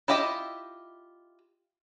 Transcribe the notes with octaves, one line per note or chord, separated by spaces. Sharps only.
E4 F4 G4 D#5 E5